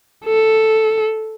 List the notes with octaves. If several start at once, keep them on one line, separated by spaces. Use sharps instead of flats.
A4